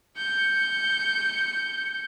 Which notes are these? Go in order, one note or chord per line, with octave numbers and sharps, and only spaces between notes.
G6 C#7